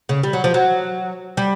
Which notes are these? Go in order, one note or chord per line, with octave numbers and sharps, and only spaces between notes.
C#3
G3
F#3
F3
F#3
G3